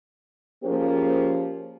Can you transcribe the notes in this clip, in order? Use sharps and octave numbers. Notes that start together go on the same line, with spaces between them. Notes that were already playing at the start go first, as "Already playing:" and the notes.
F3 A#3 C#4 G4 G#4 C5